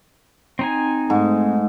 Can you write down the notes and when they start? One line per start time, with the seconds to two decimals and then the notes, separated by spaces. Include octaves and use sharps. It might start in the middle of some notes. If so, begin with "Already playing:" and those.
0.59 C4 D#4 G#5
1.10 G#2 A3